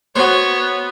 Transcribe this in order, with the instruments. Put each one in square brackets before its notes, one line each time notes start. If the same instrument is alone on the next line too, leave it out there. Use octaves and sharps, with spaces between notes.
[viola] B3 [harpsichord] F#4 C5 [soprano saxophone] C#5